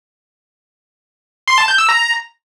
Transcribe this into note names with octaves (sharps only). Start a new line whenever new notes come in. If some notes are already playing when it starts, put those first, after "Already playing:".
C6
A5
G6
E6
A#5